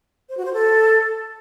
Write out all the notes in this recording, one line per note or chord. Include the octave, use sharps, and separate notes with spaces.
C5
F#4
C5
A4